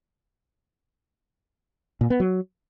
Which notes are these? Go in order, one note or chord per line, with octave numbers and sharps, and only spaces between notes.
A#2
B3
F#3